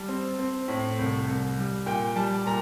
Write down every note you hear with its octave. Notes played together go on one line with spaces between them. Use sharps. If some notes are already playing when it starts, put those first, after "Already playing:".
Already playing: G3 A5
C4
C4
A2
C2
C2
G3
A#2 G5
G3 A5
A#2 A#5